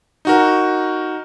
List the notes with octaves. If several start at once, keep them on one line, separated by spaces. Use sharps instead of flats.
D#4 F#4 A#4